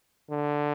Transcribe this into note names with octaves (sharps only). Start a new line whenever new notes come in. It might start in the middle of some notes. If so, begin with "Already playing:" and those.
D3